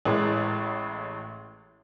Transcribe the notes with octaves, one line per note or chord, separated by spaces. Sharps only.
A1 A2 G#3